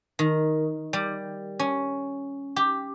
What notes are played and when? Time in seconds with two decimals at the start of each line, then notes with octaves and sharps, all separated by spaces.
0.19 D#3
0.93 G3
1.60 C#4
2.56 G4